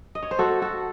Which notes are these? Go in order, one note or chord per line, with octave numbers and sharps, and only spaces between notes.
D#5
C#5
C5
F#4 A4
F#4 A4